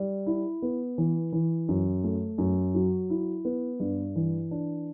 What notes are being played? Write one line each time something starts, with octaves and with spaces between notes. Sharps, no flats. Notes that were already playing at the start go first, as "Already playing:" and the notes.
Already playing: G3
E4
B3
E3
E3
F#2
A3
F#2
F#3
E4
B3
G2
E3
D4